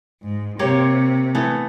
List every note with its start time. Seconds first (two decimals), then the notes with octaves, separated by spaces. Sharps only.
0.22 G#2
0.59 C3 A#3 G4 C#5
1.35 E3 A3 B3